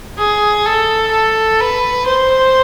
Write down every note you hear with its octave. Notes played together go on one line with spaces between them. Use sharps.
G#4
A4
A4
B4
C5